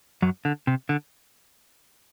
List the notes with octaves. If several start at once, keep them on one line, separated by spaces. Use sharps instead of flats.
F#2 F#3
D3
C3
D3